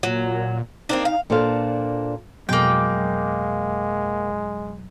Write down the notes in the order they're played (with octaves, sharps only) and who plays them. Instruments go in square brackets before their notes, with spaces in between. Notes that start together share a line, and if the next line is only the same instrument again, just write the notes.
[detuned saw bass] A#2 [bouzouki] F#3
[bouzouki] A#3 C4 D4 [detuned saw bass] D#4
[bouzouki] F5
[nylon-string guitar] A#2 D4 A4 C5 F5
[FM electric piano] F2 B2 F#3 [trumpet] G#3 [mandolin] A#3 G5